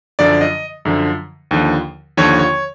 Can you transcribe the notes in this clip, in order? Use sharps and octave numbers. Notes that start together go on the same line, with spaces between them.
F#2 D3 F3 D5
D#5
F#2 D3 F3
D#2 D3 F3
D#2 D3 F3 C#5
C#5